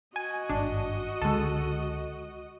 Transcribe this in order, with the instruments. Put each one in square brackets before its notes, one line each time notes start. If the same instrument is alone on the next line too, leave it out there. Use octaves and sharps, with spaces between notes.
[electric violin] F#4 D#5 [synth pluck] G#5
[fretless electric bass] G#1 G2 [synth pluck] D4
[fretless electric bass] C#2 D3 [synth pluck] G#3 A4